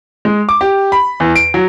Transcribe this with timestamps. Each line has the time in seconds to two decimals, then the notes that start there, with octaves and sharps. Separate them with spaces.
0.25 G#3
0.49 D6
0.61 G4
0.92 B5
1.20 E2
1.36 D7
1.54 F#3